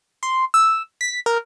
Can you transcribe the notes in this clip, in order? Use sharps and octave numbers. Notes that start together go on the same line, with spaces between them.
C6
E6
B6
A#4